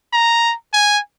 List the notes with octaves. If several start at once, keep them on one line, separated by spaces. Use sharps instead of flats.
A#5
G#5